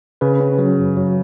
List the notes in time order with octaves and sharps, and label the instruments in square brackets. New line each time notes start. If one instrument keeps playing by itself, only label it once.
[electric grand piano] C#3 [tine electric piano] B4
[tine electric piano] C#4
F#3
F#2
F#3